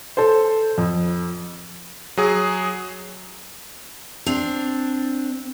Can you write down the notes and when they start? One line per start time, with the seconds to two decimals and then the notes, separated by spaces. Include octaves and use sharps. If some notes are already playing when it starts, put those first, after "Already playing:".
0.17 A4 C5
0.78 F2
2.17 F#3 G#4
4.26 C4 D4